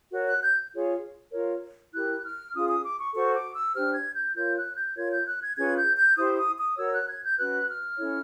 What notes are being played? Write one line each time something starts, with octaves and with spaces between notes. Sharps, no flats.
F#4 A#4 C#5
F#6
G6
F4 G#4 C#5
F4 A#4 C#5
E4 G4 A#4 F#6
F6
C#4 F4 G#4 D#6
D#6
D6
C#6
F#4 A4 C5 C#6
D6
E6
D4 G4 C5 F6
G#6
G6
F4 A#4 C#5 G6
F#6
G6
F4 A#4 C#5 G#6
G6
F#6
G#6
C#4 F4 G#4 B4 G#6
G6
G6
E4 G4 C5 D#6
D#6
D#6
F#4 A#4 C#5 E6
F#6
G#6
G6
C#4 F#4 B4 F#6
F6
C#4 E4 A4 C#5